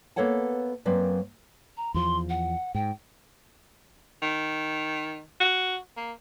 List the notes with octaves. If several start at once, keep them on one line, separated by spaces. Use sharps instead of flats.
A#3 B3 A4 C#5 F#5 A5
F#2 F#3 A#3 C4 B4 D5
A#5
E2 F3 C6
F#5
G#2 G5
D#3
F#4
A#3